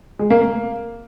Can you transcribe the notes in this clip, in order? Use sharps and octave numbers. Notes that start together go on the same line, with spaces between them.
G#3
A#3
A#3